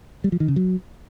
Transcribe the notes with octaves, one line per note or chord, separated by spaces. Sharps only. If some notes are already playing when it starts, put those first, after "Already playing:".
G3
F3
D#3
C#3
F#3